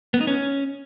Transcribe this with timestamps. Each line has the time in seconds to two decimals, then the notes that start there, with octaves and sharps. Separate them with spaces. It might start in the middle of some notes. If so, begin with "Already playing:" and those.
0.14 B3
0.21 D#4
0.27 C#4